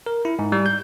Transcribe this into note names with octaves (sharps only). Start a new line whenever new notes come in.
A#4
E4
G#2
G3
G6